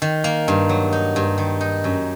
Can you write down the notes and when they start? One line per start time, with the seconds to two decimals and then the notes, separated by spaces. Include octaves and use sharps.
0.02 D#3
0.24 A#3
0.48 G2
0.69 F#3
0.93 D#4
1.16 G2
1.38 D#3
1.61 D#4
1.84 F#2